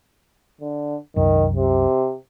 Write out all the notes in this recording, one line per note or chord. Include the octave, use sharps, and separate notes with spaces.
D3
C2 F#2 D#3
C3